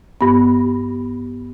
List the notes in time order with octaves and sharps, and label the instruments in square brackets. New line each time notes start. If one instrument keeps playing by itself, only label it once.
[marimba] G2 B3